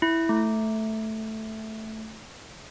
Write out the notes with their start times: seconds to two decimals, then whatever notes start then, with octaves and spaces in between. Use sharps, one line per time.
0.02 E4
0.29 A3